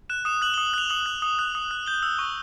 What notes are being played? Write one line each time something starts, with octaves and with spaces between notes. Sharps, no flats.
F#6 E7
D#6 E7
F#6 F#7
D#6 G7
F#7
F#6 F7
D#6 F#7
F#6
D#6
F#6
D#6
F#6
G6 G7
E6
C#6